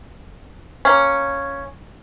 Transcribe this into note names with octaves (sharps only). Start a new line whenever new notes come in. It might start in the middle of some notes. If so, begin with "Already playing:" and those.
A#3 C#4